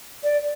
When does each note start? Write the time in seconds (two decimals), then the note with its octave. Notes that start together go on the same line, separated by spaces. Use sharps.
0.23 D5